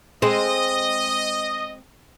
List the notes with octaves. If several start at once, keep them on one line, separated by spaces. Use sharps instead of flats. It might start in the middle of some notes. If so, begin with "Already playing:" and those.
G#3 C4 D#5